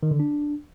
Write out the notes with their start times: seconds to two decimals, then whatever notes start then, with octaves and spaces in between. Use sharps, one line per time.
0.03 D#3
0.11 D3
0.20 D4